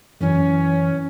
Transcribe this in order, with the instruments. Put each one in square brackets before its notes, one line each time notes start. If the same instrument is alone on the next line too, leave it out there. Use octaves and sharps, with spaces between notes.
[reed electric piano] F#2 E3 [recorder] C#4